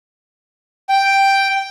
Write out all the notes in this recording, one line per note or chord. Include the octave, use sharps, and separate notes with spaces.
G5